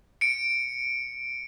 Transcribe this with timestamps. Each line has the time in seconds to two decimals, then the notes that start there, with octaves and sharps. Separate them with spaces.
0.21 C#7 D7